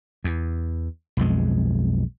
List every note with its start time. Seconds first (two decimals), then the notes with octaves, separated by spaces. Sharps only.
0.24 E2
1.17 B1 F2 G#3